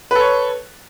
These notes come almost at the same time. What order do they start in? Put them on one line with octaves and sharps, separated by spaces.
B4 A4 C#5